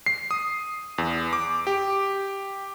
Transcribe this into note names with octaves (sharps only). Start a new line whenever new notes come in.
C7
D#6
E2
D6
G4